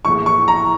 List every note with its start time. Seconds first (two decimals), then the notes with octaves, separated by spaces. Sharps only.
0.05 A#1 A2 E3 C#6
0.26 C#6
0.48 A#5